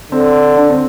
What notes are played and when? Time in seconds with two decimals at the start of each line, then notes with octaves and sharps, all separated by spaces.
0.12 D3 C4
0.57 D4
0.70 C4